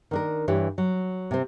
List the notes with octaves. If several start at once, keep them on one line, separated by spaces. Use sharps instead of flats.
D#3 D4 A#4
G2 E3 G4 C#5
F#3
C3 C4